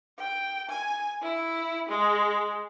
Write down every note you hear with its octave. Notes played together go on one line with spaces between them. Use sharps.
G5
G#5
E4
G#3